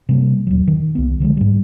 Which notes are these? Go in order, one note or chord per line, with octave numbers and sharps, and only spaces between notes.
C3 G3 A#3
D#1 C#2 F#3
D#3
C2 A#3 B3
D3 F3 F#3 G#3
G#2 G3